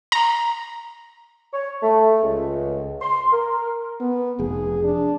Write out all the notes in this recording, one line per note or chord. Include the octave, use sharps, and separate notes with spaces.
A#5
C#5
A3
C#2
C6
A#4
B3
F1 G#4
D4